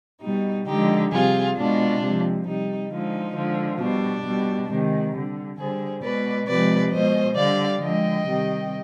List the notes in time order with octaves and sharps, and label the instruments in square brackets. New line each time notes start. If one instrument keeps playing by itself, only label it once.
[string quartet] B2 G3 D#4
D3 F3 G#3 D#4 G4
C3 G3 F4 G#4
B2 G#3 D4 F4
C3 F3 G#3
C3 G3 D#4
D3 F3 G#3 D#4
D3 F3 G#3
B2 G3 D4
B2 G3
C3 D#3 G#3
D3 G3
D3 G3 G#4 C5
B2 G#3 B4 D5
C3 F3 G#3 B4 D5
B2 G#3 C5 D#5
D3 G3 D5 F5
D3 F3 G#3 D#5 G5
C3 D#3 G3